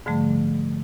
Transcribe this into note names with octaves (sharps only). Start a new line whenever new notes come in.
G#2 D3 F3 G3 A3